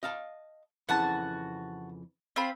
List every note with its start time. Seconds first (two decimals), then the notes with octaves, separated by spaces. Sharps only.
0.03 D#5 F5 A5
0.89 F2 C#3 E3 F#4 F#5 A5
2.36 C4 F4 B5